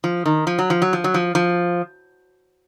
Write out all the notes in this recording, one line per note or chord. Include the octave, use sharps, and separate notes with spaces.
F3
D#3
F3
F#3
F3
F#3
F3
F#3
F3
F3